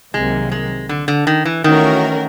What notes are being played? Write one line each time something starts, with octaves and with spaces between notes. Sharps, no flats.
C2 C3 D#3 F#3 G#3 A#3
G#3
D3
D3
D#3
E3
D#3 E3 A3 C#4 F#4 A#4